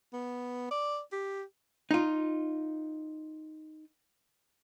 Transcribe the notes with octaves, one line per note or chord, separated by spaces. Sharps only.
B3
D5
G4
D#4 F4